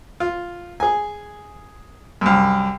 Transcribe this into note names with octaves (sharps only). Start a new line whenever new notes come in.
F4
G#4 G#5
C2 F#2